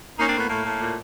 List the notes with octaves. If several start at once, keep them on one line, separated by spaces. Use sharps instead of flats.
A#3 C#4 D#4
C4 D4
A2
B3
A2 A#3
A2
A#2